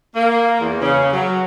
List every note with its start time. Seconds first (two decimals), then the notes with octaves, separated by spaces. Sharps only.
0.15 A#3
0.60 E2
0.82 C#3
1.12 F#3